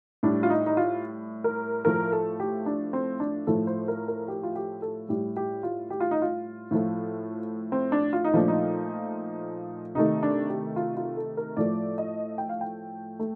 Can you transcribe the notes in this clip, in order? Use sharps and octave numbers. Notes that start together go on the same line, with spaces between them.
A2 G3 D4
F4
D#4
D#4
F4
A#4
A2 F3 A3 A#4
A4
G4
D4
C4
D4
A2 F3 A3 A4
C5
A#4
A#4
G4
F4
G4
A4
A2 G3 G4
G4
F4
G4
F4
D#4
F4
A2 F3 A3
C4
D4
F4
D#4
A#2 F3 A3 D4
D#4
C3 D#3 A3 D#4
D4
G4
F4
F4
A4
A#4
A2 F3 A3 D5
D#5
G5
F5
G5
A3